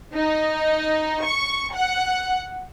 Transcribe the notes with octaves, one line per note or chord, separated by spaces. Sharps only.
D#4
C#6
F#5